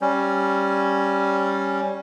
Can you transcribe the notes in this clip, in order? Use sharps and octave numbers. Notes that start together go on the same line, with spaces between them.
G3 C#4